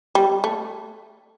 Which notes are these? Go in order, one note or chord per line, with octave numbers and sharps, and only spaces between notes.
G3
A3